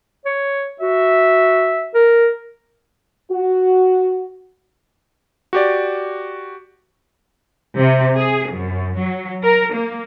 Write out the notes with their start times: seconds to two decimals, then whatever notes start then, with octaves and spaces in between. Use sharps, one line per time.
0.25 C#5
0.81 F#4 E5
1.95 A#4
3.32 F#4
5.53 F#4 G4 D5
7.78 C3
8.17 G#4
8.50 F#2
8.98 F#3
9.44 A#4
9.74 A#3